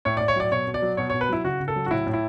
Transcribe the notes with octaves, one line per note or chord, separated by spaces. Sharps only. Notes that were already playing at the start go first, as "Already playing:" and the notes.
A2 C#5
D5
A2
C#5
F#3 D5
B2 C#5
B2
D5
F#3
B2 C#5
C#5
B2
B4
F#3 E4
C#3 F#4
C#3
A4
F#3
F#4
A2 E4
A2
E4